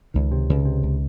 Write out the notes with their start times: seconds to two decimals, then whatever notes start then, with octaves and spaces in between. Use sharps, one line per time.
0.14 C#2 D#3
0.32 C3
0.49 C#2
0.65 C3
0.83 C#2